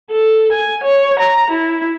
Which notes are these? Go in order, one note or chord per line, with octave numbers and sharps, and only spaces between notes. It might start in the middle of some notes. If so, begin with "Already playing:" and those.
A4
G#5
C#5
A#5
E4